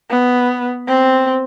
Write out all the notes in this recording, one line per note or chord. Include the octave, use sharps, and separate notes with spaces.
B3
C4